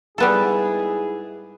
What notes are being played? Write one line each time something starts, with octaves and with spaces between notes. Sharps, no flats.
G#2 G3 B3 E4 G#4 A4